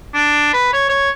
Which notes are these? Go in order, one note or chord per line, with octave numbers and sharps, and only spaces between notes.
D4
B4
C#5
C#5